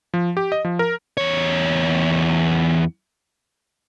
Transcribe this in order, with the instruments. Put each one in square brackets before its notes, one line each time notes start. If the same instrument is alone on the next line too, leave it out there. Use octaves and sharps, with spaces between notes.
[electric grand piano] F3
G4
D#5
F3
A#4
[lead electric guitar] E2 C#5